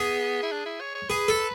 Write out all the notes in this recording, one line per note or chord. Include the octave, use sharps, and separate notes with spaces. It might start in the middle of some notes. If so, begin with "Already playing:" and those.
Already playing: B3 G#4
E4
D4
E4
C#5
C#5
G#4 B4
A4